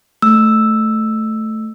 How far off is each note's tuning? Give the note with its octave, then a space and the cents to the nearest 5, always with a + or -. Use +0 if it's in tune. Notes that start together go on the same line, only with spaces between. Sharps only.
A3 +0 E6 +0